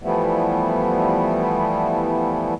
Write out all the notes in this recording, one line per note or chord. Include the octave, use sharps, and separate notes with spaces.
E3 F3 G3 A3 B3 E4